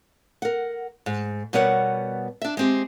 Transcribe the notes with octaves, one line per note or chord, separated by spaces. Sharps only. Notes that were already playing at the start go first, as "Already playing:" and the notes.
A#4 F#5
G#2
B2 G3 B3 A#4 C#5 F#5
D4 E5
G#3 C4 G4